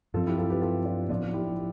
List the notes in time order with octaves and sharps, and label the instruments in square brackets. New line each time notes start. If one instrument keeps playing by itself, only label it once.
[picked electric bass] G2 F3 C4 [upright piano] F4 A4
[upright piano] E4 G4
F4 A4
G4 B4
F4 A4
D4 F4
[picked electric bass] A2 F3 B3 [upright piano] D4 F4
[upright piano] E4 G4